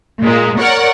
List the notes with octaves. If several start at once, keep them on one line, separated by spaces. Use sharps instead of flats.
A#2 G#3 A#3
A#4 C#5 D5 F#5